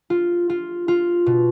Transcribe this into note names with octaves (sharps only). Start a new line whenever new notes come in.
F4
F4
F4
B2